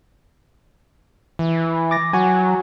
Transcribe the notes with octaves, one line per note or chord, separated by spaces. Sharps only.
E3
D6 A6 A#6
F#3 F#4 G#5